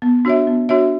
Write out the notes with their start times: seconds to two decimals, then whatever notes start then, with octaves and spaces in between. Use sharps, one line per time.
0.02 B3
0.25 D4 F#4 C#5 E5
0.47 B3
0.69 D4 F#4 C#5 E5